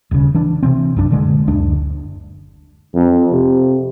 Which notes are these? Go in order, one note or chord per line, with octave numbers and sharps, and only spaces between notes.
D#1 C#3
E3 D4
C3 E3 C4
A#1 F#2 D4
F#1 A#2 D3 G#3
F#1 D2 D4
F2
C3